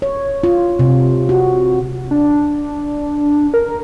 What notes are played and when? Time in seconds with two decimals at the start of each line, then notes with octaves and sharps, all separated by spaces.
0.02 C#5
0.44 F4
0.79 C3
1.29 F#4
2.11 D4
3.54 A#4